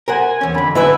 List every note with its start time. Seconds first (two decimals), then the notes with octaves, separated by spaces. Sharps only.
0.08 A#4 C5 F#5 G#5
0.41 E2 C#4
0.54 F2 D3 B5
0.75 F#2 D3 E4 B4 E5 G#5